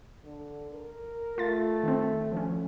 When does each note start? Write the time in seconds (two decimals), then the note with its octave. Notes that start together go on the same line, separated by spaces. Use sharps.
0.24 D3
0.73 A#4
1.38 A3 F4 A6
1.83 D#3 C4
2.32 D2 F3 C#4